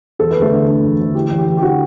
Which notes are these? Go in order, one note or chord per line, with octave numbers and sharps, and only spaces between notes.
E1 A4
D2 B4
A3 A4
D3
D3
E1
D2
A1 G4
A1
G4
A1
G4
D3 F#4